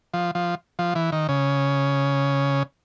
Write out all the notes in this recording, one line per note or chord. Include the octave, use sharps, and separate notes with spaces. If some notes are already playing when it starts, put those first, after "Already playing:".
F3
F3
F3
E3
D#3
C#3